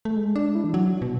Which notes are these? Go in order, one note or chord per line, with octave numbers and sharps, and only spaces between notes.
A3
G#3
D4
E4
E3
F#3
B2